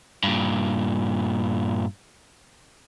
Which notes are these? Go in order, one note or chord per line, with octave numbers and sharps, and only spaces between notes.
G2 A#2